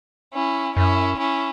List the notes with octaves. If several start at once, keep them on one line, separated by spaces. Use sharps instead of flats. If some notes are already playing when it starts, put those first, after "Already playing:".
C#4 E4
F#2 C#4 E4
C#4 E4